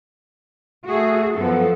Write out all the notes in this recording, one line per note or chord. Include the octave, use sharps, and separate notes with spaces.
A3 F#4 G#4
F#2 F3 B3 A4